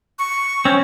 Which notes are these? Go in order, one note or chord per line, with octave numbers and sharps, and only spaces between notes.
C#6
C4 C#4